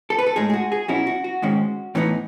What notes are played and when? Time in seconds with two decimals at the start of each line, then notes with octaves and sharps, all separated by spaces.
0.10 A4
0.18 B4
0.26 A4
0.36 A2 G#3 D#4 G#4
0.50 G#4
0.53 F#4
0.72 G#4
0.88 B2 F#3 C#4 E4 F#4
1.07 F#4
1.24 F#4
1.42 G#2 D#3 G#3 C#4
1.95 A2 E3 B3 D#4